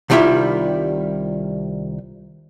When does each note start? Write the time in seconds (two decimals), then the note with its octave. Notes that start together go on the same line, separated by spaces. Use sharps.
0.10 C2 D#3 G3 E4 F4 E5